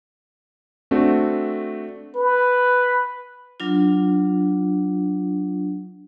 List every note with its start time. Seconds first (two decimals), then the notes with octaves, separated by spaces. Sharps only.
0.91 A3 C4 D4 F#4
2.16 B4
3.60 F#3 D4 F4